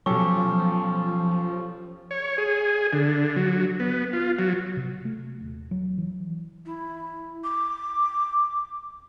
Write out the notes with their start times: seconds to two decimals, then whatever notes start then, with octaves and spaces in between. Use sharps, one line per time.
0.06 B2 F3 F#3 C#4 G4 A4 C#6
2.11 C#5
2.38 G#4
2.93 D3
3.36 F#3
3.80 B3
4.13 F4
4.39 F#3
4.77 C3
5.05 A3
5.41 D#1
5.71 F#3
5.98 E3
6.66 E4
7.44 D6